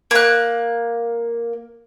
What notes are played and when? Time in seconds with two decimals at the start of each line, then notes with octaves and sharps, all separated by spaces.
0.11 A#3 F#6